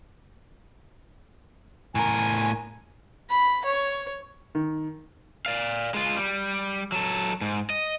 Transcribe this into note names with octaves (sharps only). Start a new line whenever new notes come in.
A2 A#4 G#5
B5
C#5
D#3
D5 F5
G#3 F4
G3
F#3 A4
G#2
D#5